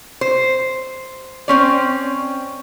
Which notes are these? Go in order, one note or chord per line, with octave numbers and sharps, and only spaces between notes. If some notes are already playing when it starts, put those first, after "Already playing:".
C5
C4 C#4 D5